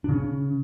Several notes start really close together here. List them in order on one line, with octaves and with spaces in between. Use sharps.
D4 C#3 C#4